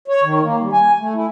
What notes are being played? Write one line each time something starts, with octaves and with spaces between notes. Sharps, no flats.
C#5
D#3
A#3
G3
G#5
A3
E4